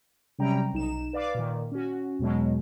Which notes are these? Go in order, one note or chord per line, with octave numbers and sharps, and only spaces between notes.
C3 F#3 G3 C#4 G5 A#5
B1 D#4 E7
B4 D5 F5 D6
A#2 D#3
C#4 F#4
E2 B2 F#3 G#3